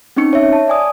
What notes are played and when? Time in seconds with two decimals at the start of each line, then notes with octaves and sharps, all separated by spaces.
0.16 C4 C#4 D#4 C#6 C#7
0.33 C#5 E5
0.53 A5
0.68 D5 G#5 D#6